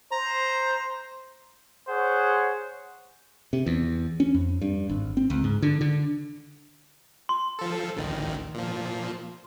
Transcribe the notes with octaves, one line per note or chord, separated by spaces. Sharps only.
C5 A#5
G#4 C5 C#5 F#5
C3
E2
C#4
F2
G2
G#1
C4
C#2
G#2
D3
D3
C6
F3 A4
A1 D2 D#3
A#2 F3